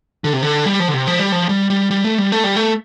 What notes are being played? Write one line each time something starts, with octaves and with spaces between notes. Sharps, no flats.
D3
C3
D3
G3
F3
D3
C3
F3
G3
F3
G3
G3
G3
A3
G3
A3
G3
A3